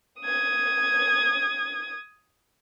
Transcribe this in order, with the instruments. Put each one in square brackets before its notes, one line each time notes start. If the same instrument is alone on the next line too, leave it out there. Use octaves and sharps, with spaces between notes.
[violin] D#6 G#6